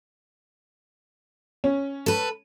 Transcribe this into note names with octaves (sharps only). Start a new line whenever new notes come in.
C#4
A4 B4